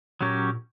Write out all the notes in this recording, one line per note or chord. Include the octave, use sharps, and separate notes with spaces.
A#2 F#3 C#4 G4 A#4 C#5